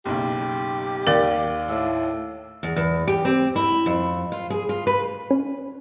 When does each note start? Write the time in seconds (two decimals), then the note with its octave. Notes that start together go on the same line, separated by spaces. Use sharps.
0.06 F#1 B1 G4
1.07 D#2 A#3 A#4 D5 F5 D6 A6
1.69 A2 E6
2.63 E2
2.76 E2
3.07 G4
3.25 C4
3.56 E4
3.86 F2
4.32 F4
4.50 G#4
4.69 F4
4.87 B4
5.31 C#4